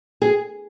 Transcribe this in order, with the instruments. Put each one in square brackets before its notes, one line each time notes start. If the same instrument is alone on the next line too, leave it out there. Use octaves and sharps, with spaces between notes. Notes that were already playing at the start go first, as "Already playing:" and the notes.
[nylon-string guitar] G#4